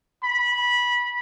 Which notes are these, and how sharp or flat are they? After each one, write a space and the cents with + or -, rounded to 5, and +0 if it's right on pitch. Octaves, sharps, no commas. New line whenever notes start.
B5 -20